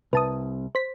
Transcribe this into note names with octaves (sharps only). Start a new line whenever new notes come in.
C2 B4 A5 D#6
C5 B6